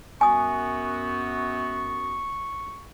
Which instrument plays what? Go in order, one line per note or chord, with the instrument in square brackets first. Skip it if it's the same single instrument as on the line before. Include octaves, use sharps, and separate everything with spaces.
[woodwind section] F#2 B3 F#4 [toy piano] G#5 D#6 [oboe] C#6